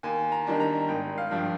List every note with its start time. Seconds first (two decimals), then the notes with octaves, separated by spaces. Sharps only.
0.03 D#2 G#5
0.32 A#5
0.47 D#3 G3 D4
0.60 A#5
0.88 G#1 G5
1.18 F5
1.31 G2 F3 G5